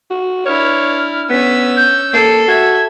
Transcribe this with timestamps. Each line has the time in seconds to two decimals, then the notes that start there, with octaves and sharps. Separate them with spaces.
0.11 F#4
0.46 D4 E4 C#5 F6
1.30 B3 C#4 E6 B6
1.77 G6
2.13 A#3 A4 C7
2.48 F#4 E5 G#6